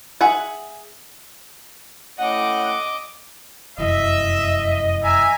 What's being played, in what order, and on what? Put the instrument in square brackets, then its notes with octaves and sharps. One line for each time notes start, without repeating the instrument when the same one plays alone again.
[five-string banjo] G#4 E5 F#5
[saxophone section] A2 C#4 F#5 [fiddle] D#5 D6
[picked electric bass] F1 F#2 E3 [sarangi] D#5 [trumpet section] E5
[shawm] E5 [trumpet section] G#5 [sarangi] A#5